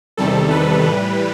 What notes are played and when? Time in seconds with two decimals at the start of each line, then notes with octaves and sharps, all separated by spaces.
0.17 E2 C3 D#3 G3 A4
0.51 B4
0.83 A2 E3 G3